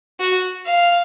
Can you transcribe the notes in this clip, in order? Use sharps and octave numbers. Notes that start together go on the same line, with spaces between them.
F#4
F5